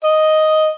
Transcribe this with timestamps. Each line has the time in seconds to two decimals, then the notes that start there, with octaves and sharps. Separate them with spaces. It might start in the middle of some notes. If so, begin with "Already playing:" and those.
0.04 D#5